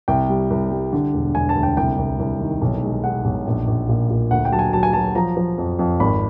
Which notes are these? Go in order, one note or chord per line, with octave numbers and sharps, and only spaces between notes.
C2 G5
G3
C2
G3
D3
E1
E1 G#5
A5
D2
G5
C2 G5
C2
C2
D#3
B1
G#3
G#3 F#5
B1
A#1
A#1
A#2
A#2
D2 F#5
G5
F#3 A5
G#5
F#3 A5
G#5
F#3 A5
F3 A#5
F3
F2
F2
G#1 B5